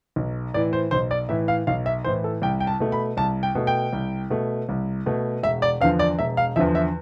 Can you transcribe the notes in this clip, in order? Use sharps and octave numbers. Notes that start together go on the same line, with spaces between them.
B1
A2 E3 D5
C5
B1 C5
D5
A2 E3 E5
F5
B1 F5
E5
A2 E3 C5
A4
C2 G5
G5
A5
B2 A3
B5
C2 A5
G5
B2 A3
G5
C2
B2 A3
C2
B2 A3
E1 E5
D5
E2 D3 F3 F5
D5
E1 E5
F5
E2 D3 F3 E5
E5